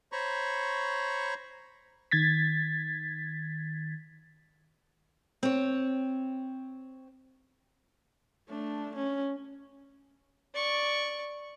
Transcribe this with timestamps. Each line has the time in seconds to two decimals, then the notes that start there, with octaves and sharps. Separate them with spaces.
0.12 C5 C#5 A#5 B5 C#6
2.11 D#3 G#6 A6 B6
5.43 C4 C#5
8.49 A3 D4
8.96 C#4
10.54 D5 C#6